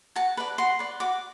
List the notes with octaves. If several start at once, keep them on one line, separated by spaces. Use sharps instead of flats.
F#4 A5
B4 D5
F#4 C6
B4 D5
F#4 D6